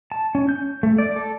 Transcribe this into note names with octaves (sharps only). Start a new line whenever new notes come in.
A5
C#4
G6
A3
D5
A4